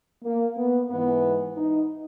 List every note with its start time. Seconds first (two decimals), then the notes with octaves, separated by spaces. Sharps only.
0.24 A#3
0.57 B3
0.91 G#2 E3 B3
1.57 D#4